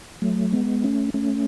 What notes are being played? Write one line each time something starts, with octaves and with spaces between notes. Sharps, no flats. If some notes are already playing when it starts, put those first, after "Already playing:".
F#3 A3
G#3 B3
A3 C#4
A3 C#4